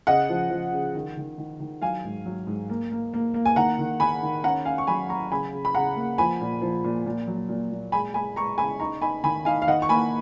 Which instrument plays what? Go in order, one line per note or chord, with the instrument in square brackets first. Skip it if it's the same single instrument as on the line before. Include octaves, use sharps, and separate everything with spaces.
[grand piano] C#3 D#5 F#5
F3
F3
C#3
D#3
D#3
D#3
D#3
F#3 F5 G#5
G#2
F#3
G#2
A#3
A#3
A#3
A#3
G#5
D#3 F#5 A#5
D#3
D#3 G#5 B5
D#3
C#4 F#5 A#5
C#4 F5 G#5
C#6
F#3 G#5 B5
F#3 A#5 C#6
C#3 G#5 B5
C#3
B5
C#3 F#5 A#5
A#3
F3 G#5 B5
A#2
F3
A#2
A#2
F#3
A#2
A#2
G#3 G#5 B5
G#3 G#5 B5
G#3 A#5 C#6
C#3 G#5 B5
D#4 A#5 C#6
D#4 G#5 B5
D#3 G#5 B5
D#4 F5 G#5
F5
D#3 D#5 F#5
C#6
A#3 G#5 B5